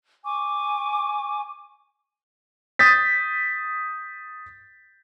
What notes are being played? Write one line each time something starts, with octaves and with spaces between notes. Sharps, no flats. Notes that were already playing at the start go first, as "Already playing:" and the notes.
G#5 C#6 D6
D#6 G6 A6 B6